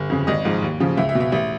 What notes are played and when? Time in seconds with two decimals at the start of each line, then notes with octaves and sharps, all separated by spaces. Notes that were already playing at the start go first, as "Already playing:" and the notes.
Already playing: G1
0.10 F2 C#3
0.27 G#1 D#5
0.45 G#2 F3
0.62 D#2
0.80 C#3 F3
0.97 C#2 E5
1.09 E5
1.15 B2
1.20 E5
1.32 A1 E5